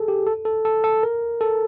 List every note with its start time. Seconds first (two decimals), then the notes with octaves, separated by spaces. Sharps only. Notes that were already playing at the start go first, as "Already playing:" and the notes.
Already playing: G#4 A4
0.08 G4
0.26 A4
0.45 A4
0.65 A4
0.84 A4
1.03 A#4
1.41 A4